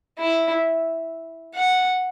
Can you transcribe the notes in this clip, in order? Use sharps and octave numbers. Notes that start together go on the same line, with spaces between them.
E4
F#5